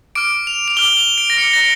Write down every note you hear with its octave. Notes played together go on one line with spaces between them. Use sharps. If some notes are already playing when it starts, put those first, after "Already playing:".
D6 F6 D7
F7
F7
D6 F6 G7
F7
D7
A#6
D6 F6 C#7
A#6